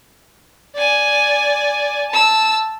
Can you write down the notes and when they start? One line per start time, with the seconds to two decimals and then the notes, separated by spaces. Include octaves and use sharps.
0.76 D5 G#5
2.10 A5 E6